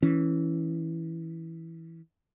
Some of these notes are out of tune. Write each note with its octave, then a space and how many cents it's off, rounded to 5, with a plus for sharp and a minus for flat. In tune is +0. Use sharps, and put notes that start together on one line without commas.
E3 -10 C#4 +0